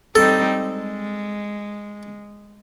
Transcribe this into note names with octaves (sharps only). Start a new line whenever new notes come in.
G3 C4 D#4 A4
G#3